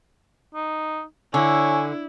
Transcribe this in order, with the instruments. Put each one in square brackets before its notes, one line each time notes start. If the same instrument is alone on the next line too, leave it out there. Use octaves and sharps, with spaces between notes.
[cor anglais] D#4
[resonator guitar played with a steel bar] D3 [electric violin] E4 [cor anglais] C#5 [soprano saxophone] G#5